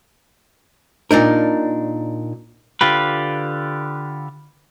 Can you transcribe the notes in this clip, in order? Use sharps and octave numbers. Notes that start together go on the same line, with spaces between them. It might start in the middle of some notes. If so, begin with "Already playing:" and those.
A#2 D4 D#4 A#4
D3 F4 G4 B4